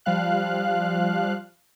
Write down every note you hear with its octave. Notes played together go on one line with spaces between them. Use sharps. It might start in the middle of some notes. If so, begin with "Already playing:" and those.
F3 G3 F5 F#6